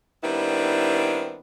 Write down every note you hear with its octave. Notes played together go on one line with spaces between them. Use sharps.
D#3 G3 B3 C4 D4 E4